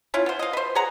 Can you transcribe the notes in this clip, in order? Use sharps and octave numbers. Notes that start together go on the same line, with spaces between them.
C#4 E4 F4
B3 C5
D#5 F5
B4 C5
G#4 F#5 A#5